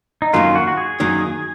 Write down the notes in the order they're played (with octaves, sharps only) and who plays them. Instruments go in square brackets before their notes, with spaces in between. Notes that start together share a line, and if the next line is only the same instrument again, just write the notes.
[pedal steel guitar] D#4
[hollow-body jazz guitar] F#2 D#3 A#3 [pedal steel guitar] F4
[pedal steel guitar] F#4
F#4
G#4
[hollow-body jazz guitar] F#2 D#3 A#3